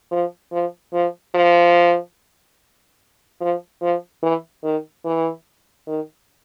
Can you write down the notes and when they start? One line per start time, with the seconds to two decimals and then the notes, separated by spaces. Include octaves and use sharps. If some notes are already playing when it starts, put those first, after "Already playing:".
0.11 F3
0.52 F3
0.93 F3
1.35 F3
3.41 F3
3.82 F3
4.22 E3
4.63 D#3
5.05 E3
5.87 D#3